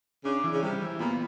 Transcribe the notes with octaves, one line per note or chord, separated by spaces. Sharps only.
C#3 D4
E3
C#3
C3 G3
E3
A#2 B3